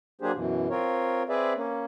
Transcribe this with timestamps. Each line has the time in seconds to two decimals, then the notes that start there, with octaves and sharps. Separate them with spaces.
0.21 F#3 A#3 D4 G4 G#4 C5
0.35 F#2 B2 E3
0.70 C4 F4 A#4 C#5
1.29 C4 G#4 B4 D5 E5
1.56 A#3 C#4